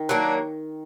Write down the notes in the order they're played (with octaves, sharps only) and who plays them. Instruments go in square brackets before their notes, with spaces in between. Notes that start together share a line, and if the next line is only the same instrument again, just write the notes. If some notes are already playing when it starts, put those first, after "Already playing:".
Already playing: [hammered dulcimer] D#3
[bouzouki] F#3 A#3 D4